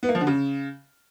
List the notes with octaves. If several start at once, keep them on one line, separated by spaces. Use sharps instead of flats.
B3
A#3
F3
D3
C#3